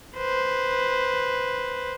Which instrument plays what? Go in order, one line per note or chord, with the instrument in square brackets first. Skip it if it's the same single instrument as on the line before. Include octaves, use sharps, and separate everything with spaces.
[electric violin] B4 C5